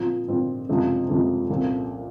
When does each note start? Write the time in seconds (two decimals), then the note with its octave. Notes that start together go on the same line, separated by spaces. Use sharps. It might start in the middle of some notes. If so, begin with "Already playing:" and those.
Already playing: A#2 F3 C4
0.28 A#2 F3 C4
0.69 F#1 F2 C3 F3 G#3
1.08 F#1 F2 C3 F3 G#3
1.50 C2 A#2 F3